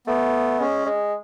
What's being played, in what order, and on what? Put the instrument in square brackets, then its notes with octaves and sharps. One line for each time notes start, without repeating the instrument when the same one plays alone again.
[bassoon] A3 [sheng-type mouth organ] B3
[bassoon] G#3 [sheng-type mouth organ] C#4
[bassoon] G#3